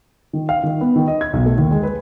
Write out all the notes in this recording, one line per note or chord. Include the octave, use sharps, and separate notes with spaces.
D#3
F5
D#3
B3
D#3
D#5
G#6
B1
A3
D#2
G#3
B4